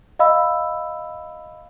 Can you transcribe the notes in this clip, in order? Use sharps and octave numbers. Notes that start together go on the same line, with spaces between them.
D#5 F5 B5 E6